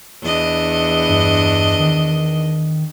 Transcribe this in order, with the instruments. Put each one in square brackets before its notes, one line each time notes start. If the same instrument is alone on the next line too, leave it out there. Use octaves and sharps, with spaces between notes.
[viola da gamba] E2 D4 D#5
[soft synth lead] G2
D#3